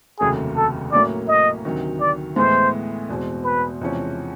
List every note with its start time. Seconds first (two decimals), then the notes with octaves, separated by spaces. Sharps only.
0.20 F1 D#2 C#3 F#3 A3 G#4
0.56 A4
0.92 A2 F#3 A#3 C#4 D5
1.28 D#5
1.65 D2 C3 D#3 F#3
2.00 D5
2.36 A2 E3 G#3 B3 E4 C5
3.09 E2 B2 G#3 C4
3.44 B4
3.81 E2 C3 F3 G#3 C#4